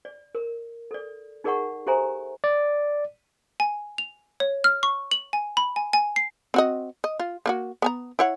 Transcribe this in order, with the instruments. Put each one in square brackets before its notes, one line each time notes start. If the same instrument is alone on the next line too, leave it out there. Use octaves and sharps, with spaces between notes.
[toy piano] D5
A#4
A4 D5
D#4 G#4 A#4 D5 F#5 C#6
G4 A4 C5 E5 G#5 A#5
[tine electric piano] D5
[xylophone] G#5
F7
C#5
F6
C#6
F#7
G#5
B5
G#5
G#5
C7
[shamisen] C4 F#4 D#5
D#5
F4
A#3 E4 F#4
B3 G#5 A#5
E4 C#5 F#5